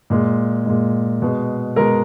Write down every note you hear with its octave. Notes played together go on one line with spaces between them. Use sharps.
A#2 G#3
A#2 G#3
B2 G#3
B2 G#3 A#4 A#5